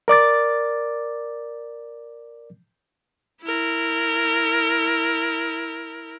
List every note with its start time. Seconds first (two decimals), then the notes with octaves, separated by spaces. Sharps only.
0.08 A#4 D5 D6 A6
3.42 E4 A#4